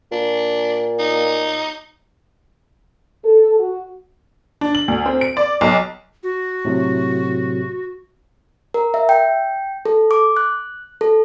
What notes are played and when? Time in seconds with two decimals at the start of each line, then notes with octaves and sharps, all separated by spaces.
0.12 A#2 D4
0.99 D#4
3.25 A4
3.60 F#4
4.61 D4
4.75 F#7
4.88 D2
5.06 C4
5.21 D7
5.37 D5
5.61 B1
6.23 F#4
6.65 A2 C3 F#3
8.74 A#4
8.94 E5
9.09 G5
9.85 A4
10.11 D6
10.37 F#6
11.01 A4